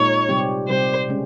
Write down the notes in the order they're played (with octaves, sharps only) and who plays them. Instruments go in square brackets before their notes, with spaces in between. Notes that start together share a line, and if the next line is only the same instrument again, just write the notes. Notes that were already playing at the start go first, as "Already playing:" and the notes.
Already playing: [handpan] A#2 G#3 D#4 [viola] C#5
[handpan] C3 G3 C4 G4
[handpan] C3 G3 C4 G4 [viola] C5
[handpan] C#3 G#3 C#4